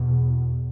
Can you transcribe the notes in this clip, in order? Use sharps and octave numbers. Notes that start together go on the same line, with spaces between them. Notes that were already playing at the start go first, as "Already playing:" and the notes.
Already playing: E2 B2